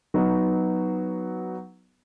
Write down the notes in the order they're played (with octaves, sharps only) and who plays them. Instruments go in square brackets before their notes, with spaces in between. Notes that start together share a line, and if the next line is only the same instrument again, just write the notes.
[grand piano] F#3 B3 D#4 F#4